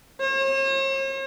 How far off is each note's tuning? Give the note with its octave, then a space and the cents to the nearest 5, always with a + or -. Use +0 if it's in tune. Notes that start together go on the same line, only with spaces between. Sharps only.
C#5 -45